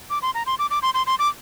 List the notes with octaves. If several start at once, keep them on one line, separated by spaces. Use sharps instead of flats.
D6
C6
A#5
C6
D6
D6
C6
C6
C6
D6